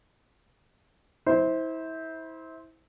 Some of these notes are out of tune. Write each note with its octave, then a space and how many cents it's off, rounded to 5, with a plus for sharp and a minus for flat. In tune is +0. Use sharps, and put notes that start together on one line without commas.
E4 -30 C5 +0